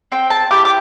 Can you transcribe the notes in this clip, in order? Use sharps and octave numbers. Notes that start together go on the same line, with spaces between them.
C4 G5
A5
E4 G4 D6
D6